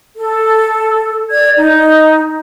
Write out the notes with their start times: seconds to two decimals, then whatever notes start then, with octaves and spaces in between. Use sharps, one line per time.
0.17 A4
1.31 D5 G#6
1.57 D#4